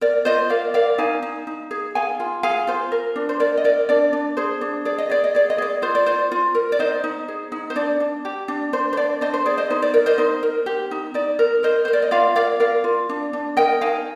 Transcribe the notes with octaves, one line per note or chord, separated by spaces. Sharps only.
A#4 D5
F4 C5 D#5
A#4 D5 F5
A#4 D5 F5
D#4 F5 G#5
D#4
D#4
G#4
G#4 F5 G#5
F4
G#4 F5 G#5
F4 C5
A#4
D4
C5
A#4 D5
D#5
A#4 D5
D4 D5
D4
G#4 C5
D4
G#4 D5
D#5
G#4 D5
D#5
G#4 D5
D#5
G#4 D5
F4 C5
D5
F4 C5
F4
A#4
D5
D#4 C5 D#5
D#4
G#4
D#4
C5
D4 D5
D4
G4
D4
D4 C5
C5
D4 D5
D4 C5 D#5
C5
G#4 D5
C5 D#5
D#4 C5
D5
A#4 D5
C5 D#5
D#4 C5
A#4
G4
D#4
D#4 D5
A#4
A#4 C5 D#5
A#4 C5
D5
D#5
F4 D5 F5
A#4 D5 F5
A#4 D5 F5
F4
D4
D4
A#4 D#5 G5
D#4 F5 G#5